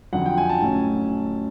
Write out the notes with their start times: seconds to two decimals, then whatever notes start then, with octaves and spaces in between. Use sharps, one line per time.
0.13 F2 D3 F#3 F#5
0.26 G5
0.38 G#5
0.49 A5
0.62 A2 F#3 A3 C#4